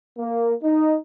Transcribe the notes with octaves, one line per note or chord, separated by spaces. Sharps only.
A#3
D#4